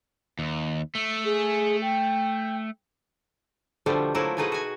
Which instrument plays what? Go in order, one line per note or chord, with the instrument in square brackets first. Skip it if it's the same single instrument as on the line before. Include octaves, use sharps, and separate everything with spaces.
[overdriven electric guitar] D#2
A3
[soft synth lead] G#4
G5
[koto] B2 D3 F3 G3 A3
F3 F#3 A3 A#3 E4
B2 E3 A3 D#4 G#4 B4
F#4 G#5